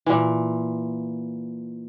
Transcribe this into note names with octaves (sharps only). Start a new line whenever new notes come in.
A#2 E3